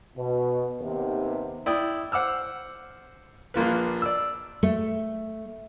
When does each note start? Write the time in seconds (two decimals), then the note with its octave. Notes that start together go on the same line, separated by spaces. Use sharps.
0.17 B2
0.81 D#2 C3 B3
1.66 E4 D5 G5 D#6
2.12 C5 F#5 D6 E6 F6
3.54 A#1 A#3 F4 B4
4.02 D5 E6
4.63 A3